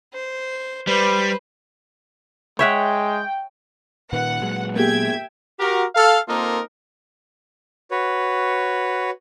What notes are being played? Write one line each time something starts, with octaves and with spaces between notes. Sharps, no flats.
C5
G3 B4 C5
G#3 C#5 E5 F#5 G5
A#2 D#3 B4 F#5
A#2 F#3 G#3
A#3 B3 G4 G#4 E5 G5 G#6
F#4 G4 A#4
A4 F5
A#3 C4 D#4 F4 A4 A#4
F#4 B4 C#5